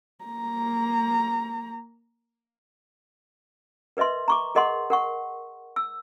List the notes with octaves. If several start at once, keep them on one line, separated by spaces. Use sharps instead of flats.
A#3 A#5
A#4 B4 D#5 E5 C6
A#5 C#6 D6
G#4 A#4 D#5 F#5 C6
A#4 F#5 C#6
E6